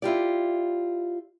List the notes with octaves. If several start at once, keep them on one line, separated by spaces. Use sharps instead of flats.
E4 F4 G4 D5